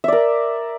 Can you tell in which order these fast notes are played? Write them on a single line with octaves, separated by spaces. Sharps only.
E5 D5 A#4